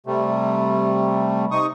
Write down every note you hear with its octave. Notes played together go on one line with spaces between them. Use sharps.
C3 G3 A3
C3 D#4 C#6 D#6